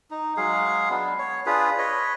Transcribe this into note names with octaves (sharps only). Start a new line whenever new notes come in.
D#4
F#3 G#3 G#4 F5
B3 D4
C#5
D4 F4 G#4 B4
B4 C#5 D#5